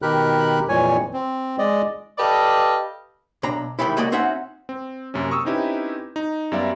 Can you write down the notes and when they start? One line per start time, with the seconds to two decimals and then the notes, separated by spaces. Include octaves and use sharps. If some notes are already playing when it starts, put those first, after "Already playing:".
0.02 B2 D#3 G4 A#4 B5 F#6
0.69 F2 A#2 E3 G3 C#5 G#5
1.13 C4
1.59 G#3 D5 D#5
2.18 G4 A4 B4 D5 D#5 F5
3.43 B1 D4 A#5
3.79 D#3 E3 G3 G#3 E4
3.97 C#2 F#3 A#3 F#4 D5 D#5
4.12 C4 C#4 D#4 F#4 E5 F#5
4.69 C4
5.14 F#2 C3 A#3 C#4
5.31 C#6 D#6 E6
5.45 C4 C#4 D#4 E4 G4 B4
6.16 D#4
6.52 F#2 G3 B3 D5 E5 F5